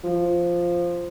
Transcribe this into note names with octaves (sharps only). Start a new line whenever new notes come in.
F3